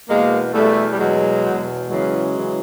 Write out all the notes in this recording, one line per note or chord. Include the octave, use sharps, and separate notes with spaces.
E2 B2 G#3 A#3
E2 B2 G3 A3
G3
E2 B2 F#3 G#3
E2 B2
E2 C#3 E3 F#3 G#3
C#3 E3